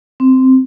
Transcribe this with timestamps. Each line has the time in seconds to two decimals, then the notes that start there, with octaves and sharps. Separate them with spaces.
0.20 C4